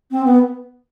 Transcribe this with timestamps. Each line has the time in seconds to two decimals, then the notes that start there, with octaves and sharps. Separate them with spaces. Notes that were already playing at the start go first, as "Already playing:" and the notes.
0.11 C4
0.24 B3